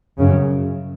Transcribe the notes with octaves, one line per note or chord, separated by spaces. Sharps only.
F#2 C#3